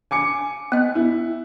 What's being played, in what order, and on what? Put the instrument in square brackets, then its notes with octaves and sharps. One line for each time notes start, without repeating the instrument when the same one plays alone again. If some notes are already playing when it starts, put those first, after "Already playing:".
[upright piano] G#5 D6 C#7
[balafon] B3 D#5
[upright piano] E4